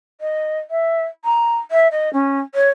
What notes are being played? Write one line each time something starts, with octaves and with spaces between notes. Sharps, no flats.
D#5
E5
A#5
E5
D#5
C#4
C#5